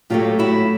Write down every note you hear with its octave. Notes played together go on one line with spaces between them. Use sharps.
A2 F#3 A3 F4 G4
E4 F#4